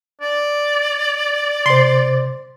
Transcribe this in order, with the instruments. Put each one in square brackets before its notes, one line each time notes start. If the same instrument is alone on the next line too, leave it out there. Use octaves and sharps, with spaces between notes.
[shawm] D5
[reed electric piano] C3 C5 [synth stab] C6